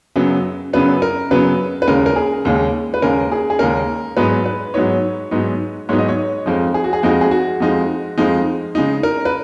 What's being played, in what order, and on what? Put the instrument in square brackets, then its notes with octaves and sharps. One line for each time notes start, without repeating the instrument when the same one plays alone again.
[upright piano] F#2 C#3 F#3 B3
F#2 C#3 F#3 B3 B4
A#4
F#2 C#3 F#3 B3 B4
B4
D#2 C#3 G#3 C#4 A#4
A#4
G#4
D#2 C#3 G#3 C#4
B4
D#2 C#3 G#3 C#4 A#4
G#4
G#4
D#2 C#3 G#3 C#4 A#4
G#2 F#3 B3 D#4 B4
B4
G#2 F#3 B3 D#4 C#5
G#2 F#3 B3 D#4
G#2 F#3 B3 D#4 C#5
D#5
C#5
F2 F3 G#3 D#4
G#4
F#4
G#4
F2 F3 G#3 D#4 F#4
G#4
F#4
F2 F3 G#3 D#4
F2 F3 G#3 D#4
C#3 G#3 D#4
A#4
B4